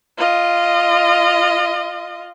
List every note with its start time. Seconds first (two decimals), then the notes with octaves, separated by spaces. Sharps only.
0.17 F4 D#5